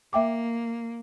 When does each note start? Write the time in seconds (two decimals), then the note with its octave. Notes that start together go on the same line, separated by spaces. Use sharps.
0.13 A#3 E5 G5 D6